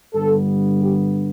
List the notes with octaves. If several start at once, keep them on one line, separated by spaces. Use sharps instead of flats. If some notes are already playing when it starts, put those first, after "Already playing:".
G2 D3 G3 B3 A4
G4